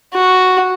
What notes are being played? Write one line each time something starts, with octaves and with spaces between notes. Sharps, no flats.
F#4